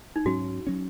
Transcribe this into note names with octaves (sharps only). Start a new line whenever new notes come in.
D#4
G#2 F#3 C#4 F#4
F#3 C#4